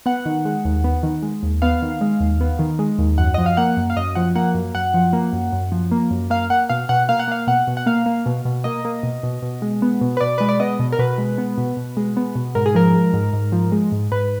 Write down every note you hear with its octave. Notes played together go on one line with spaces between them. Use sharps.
B3 F#5
D#3
G#3
D#2
B3
D#3
G#3
D#2
B3 F5
D#3
G#3
D#2
B3
D#3
G#3
D#2
F#2 F#5
F3 D#5
F5
A#3 F#5
F#2
F5
F#2 D#5
F3 F#5
A#3 F#5
F#2
F#2 F#5
F3
A#3
F#2
F#2
F3
A#3
F#2
A#3 F5
A#3 F#5
B2 F5
B2 F#5
A#3 F5
F#5
A#3 F5
B2 F#5
B2
F#5
A#3 F5
A#3
B2
B2
A#3 D#5
A#3
B2
B2
B2
G#3
B3
B2
B4
B2 D5
G#3 B4
D5
B3 D#5
B2
A#4
B2 B4
G#3
B3
B2
B2
G#3
B3
B2
G#2 A#4
G#4
F3 A#4
G#3
G#2
G#2
F3
G#3
G#2
G#2 B4